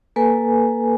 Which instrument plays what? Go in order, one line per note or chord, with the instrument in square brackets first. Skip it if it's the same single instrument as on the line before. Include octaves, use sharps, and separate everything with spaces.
[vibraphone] A#3 A4 B4 G#5